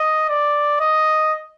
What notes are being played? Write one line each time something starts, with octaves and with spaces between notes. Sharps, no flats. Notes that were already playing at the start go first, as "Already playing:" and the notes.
Already playing: D#5
D5
D#5